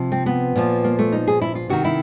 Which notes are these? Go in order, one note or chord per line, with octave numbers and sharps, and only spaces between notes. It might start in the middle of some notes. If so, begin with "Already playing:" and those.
Already playing: C3 F3
C4
B3
A#2 F3
A#3
A3
D#4
G#4
E4
F4
C3 D#3 F#4
E4